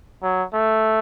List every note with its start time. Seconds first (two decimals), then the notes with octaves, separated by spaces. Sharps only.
0.23 F#3
0.54 A3